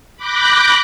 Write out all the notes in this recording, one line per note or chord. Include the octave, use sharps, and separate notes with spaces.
B5 D6 F#6 G6 A#6